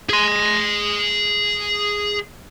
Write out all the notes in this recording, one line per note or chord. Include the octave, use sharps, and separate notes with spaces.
G#4 C6